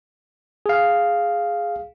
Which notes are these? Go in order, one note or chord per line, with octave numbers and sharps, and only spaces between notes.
G#4 F5